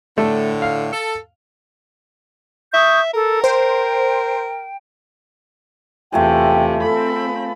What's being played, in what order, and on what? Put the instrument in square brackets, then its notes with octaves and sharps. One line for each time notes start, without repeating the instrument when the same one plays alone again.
[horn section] A2 D3 [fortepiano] A3
[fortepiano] F5
[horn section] A4
[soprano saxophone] E5 [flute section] C#6 D#6 G6
[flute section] A4 [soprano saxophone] A#4
[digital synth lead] C5 [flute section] G5
[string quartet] E2 C3 [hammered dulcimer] A3 F4 G#4 [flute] G5
[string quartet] C4 B5 [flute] A4